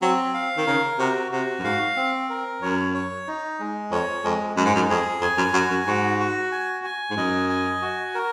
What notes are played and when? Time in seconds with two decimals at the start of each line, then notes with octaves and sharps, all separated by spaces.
0.02 F#3 C4
0.34 F5
0.57 D#3
0.66 C#3 A#4
0.99 C3 F#4
1.32 C3 F#4
1.59 F#2
1.64 G#2 F5
1.96 C4
2.30 A#4
2.62 F#2 C#5
2.94 C#5
3.27 D#4
3.60 G#3
3.91 F2 C#5
4.24 F2 G#3
4.57 F#2 G#3
4.66 G#2
4.76 F#2
4.90 F2 G#4
5.22 F2 G#5
5.38 F#2
5.54 F#2 F#4
5.71 F#2
5.87 G#2 F#4
6.20 F#4
6.52 G#5
6.84 G#5
7.11 G#2
7.17 F#2 D#5
7.49 G#5
7.82 F#4
8.14 A#4